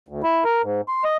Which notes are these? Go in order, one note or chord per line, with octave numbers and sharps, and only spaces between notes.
D2
E4
A#4
G#2
C6
D#5